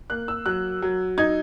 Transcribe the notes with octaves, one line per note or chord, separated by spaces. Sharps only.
A#3 F#6
E6
F#3 F#6
F#3
D#4 G#6